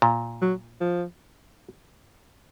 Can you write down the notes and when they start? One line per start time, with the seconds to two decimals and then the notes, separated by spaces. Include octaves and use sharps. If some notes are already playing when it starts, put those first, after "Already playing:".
0.02 A#2
0.41 F#3
0.81 F3